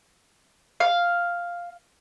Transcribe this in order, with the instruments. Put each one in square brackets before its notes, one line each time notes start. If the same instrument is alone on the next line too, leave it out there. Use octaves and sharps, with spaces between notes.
[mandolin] F5